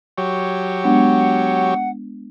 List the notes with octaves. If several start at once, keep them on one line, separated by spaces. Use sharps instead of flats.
F#3 G4 C#5
G#3 B3 D4 F#5